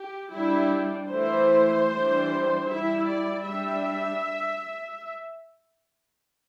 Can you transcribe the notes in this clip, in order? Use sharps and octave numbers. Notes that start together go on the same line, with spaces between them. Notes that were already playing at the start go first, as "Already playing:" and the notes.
Already playing: G4
G3 D4 E4
E3 A3 E4 C5
E3 G3 D4
G3 E4 E5
D5
G3 D4 E5